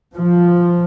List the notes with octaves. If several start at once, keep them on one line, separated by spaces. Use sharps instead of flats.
F3